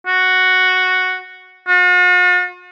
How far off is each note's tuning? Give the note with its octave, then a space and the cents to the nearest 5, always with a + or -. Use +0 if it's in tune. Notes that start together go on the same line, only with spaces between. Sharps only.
F#4 +0
F#4 -45